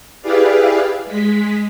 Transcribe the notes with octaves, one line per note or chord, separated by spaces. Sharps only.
E4 G4 G#4 B4 D5 F5
G#3 B6